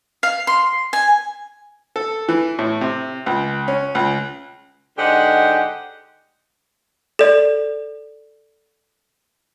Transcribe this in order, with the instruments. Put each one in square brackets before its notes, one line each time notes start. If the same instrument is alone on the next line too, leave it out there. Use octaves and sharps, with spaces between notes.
[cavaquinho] F5
C6
G#5
[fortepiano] A4
E3
A2
C3
C#2
C#4
C#2
[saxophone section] G#2 D3 G4 D#5 F#5
[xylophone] A4 D5